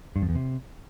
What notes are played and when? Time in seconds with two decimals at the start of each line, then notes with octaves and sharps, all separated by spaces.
0.16 G2
0.22 F2
0.29 E2
0.35 C3